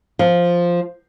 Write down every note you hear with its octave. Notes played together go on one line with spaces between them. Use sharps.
F3